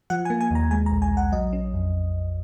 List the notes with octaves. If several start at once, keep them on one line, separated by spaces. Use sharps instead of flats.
F3 F#5
G#5
A#3
G#5
D#2 A#5
G#3 G#5
A#5
A#1
G#5
A#1
F#5
F#3 D#5
C#4
F2